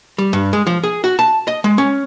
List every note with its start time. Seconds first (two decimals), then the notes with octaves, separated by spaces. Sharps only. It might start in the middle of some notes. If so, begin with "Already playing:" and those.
0.18 G3
0.33 G2
0.53 G#3
0.67 F3
0.84 G#4
1.04 F#4
1.19 A5
1.48 D#5
1.64 G#3
1.78 C#4